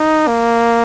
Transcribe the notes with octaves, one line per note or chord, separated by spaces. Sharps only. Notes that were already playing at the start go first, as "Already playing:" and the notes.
Already playing: D#4
A#3